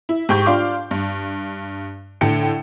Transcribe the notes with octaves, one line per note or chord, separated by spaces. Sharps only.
E4
G#2 G4 G5 C#6 G6
D4 F4 F5 C6 D6
G2
A2 D3 G5 C#7